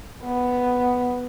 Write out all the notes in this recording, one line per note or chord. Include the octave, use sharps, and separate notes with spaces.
B3